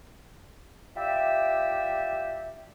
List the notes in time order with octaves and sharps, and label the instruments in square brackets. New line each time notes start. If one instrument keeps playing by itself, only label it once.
[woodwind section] F4 G4 D5 E5